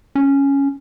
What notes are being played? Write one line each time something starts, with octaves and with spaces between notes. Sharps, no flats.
C#4